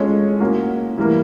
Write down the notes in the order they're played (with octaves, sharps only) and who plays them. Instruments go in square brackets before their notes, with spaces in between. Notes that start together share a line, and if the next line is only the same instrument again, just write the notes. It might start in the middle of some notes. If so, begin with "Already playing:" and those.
Already playing: [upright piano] G#3 C#4 F4 A4 C#5
A#3 C#4 F#4
E3 G3 A#3